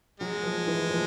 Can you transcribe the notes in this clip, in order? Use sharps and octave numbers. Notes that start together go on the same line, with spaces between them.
F#3 G#3
F3
E3
F3